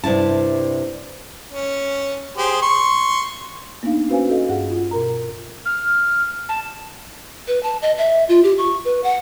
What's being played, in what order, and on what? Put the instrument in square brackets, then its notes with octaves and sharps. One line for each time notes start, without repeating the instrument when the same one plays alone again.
[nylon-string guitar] G2 C3 E4 A5
[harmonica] C#4
G4 G#4 C5
C6 C#6
[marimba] A#3 B3 D4 D#4 F5
C#4 F#4 B4 C5 F5 G#5
F#4 A4 D#5 F5
G2 G#4 F#5
F4
B2 A#4 A#5
[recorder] F6
A5
[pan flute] B4
A5
D#5
E5
F4
G4
C#6
B4
F#5